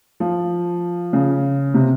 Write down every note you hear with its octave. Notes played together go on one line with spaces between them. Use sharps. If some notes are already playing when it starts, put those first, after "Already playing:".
F3
C#3
C3